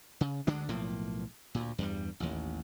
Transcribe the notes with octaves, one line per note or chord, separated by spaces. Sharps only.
C#3
D2 D3 G#3 D4
B1 A2 F3 A#3
D2 A#2
E2 G2 G3
A1 D#2